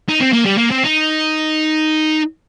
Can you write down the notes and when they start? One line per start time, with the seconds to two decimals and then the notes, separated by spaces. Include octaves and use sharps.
0.09 D#4
0.21 C4
0.33 A#3
0.46 G3
0.58 A#3
0.71 C4
0.84 D#4